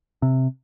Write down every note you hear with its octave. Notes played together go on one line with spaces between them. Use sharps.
C3